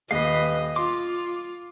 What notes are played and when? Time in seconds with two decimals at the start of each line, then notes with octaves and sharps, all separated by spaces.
0.11 D#1 B4 D#5 F5
0.76 F4 C6 D6